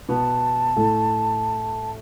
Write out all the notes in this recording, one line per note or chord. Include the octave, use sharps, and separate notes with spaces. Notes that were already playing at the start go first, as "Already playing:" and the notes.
B2 B3 A5
A2 A3